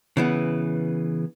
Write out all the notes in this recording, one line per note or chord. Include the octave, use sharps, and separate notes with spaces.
C#3 E3 B3